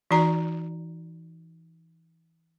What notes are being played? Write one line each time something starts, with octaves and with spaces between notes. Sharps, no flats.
E3 D#4 F#4 D5 A#5